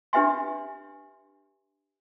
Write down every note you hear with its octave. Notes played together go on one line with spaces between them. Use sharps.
D4 G4 B4 E5 G#5 C6